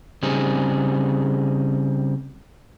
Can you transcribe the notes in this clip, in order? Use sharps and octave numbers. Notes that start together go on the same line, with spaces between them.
C#3 G3 C4 D#4 G#4